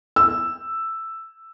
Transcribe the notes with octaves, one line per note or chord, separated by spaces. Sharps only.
E6